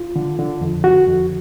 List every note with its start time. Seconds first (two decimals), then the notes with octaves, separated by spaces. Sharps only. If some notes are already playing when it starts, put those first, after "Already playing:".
Already playing: F4
0.16 D3
0.39 D3
0.61 F2
0.84 D3 F#4
1.07 F2